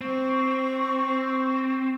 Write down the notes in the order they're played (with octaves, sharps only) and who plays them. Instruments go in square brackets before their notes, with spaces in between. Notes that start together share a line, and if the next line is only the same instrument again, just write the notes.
[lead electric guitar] C4 [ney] C#6